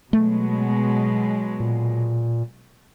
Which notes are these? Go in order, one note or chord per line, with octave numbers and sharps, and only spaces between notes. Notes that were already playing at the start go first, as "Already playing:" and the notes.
B2 F#3 G#3 A3
A#2